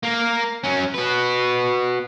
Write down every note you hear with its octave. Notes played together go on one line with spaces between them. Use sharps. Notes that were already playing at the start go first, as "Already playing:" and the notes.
A#3 A#4
F#3 C#4
F#4 B4